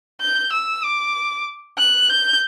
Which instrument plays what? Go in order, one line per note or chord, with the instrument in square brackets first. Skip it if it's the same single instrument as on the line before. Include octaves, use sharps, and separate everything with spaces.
[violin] G6
E6
D6
F#6
G6